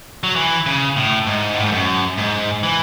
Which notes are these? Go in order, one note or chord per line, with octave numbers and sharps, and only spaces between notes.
F#3
E3
C#3
A2
G#2
A2
G#2
F#2
G#2
E3